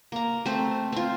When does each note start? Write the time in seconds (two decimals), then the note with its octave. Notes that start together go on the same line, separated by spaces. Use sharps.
0.12 A#3 A#5
0.46 A3 C4 C5
0.92 C4 F4